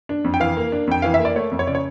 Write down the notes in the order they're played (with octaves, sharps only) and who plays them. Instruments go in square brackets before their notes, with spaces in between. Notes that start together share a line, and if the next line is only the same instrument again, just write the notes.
[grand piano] D4
F2
G5
E3 F5
A#3
D4
F2 G5
E3 F5
E5
A#3
D5
A3 C#5
F2
C#5
C#3 D5
C#5